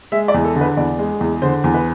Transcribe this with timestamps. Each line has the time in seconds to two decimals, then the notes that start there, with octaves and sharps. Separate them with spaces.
0.12 G#3 E5
0.28 D5
0.34 E2
0.45 A4
0.55 D3
0.61 B4
0.77 E2 D5
0.99 G#3
1.21 E2
1.42 D3 C5
1.64 E2
1.74 B4